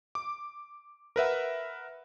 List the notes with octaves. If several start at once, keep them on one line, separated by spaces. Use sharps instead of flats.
D6
A#4 B4 E5 F#5